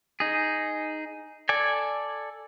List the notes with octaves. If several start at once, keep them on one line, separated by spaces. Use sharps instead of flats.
D#4 G#4
A4 D5 G#5